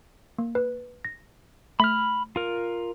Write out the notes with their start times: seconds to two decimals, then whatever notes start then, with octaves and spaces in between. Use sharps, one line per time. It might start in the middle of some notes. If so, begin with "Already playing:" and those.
0.38 A#3
0.55 B4
1.05 A#6
1.80 A3 B5 F6 B6
2.36 F4 A#4